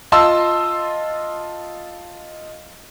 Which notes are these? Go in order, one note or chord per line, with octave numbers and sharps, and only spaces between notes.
F4 D#5 A5 C6 E6